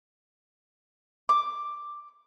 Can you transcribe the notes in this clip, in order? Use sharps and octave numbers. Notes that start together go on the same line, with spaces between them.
D6